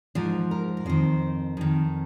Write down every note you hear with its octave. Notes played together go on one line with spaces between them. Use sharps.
G#2 F3 A#4
A#4
A#4
F2 D#3 C5
F2 D#3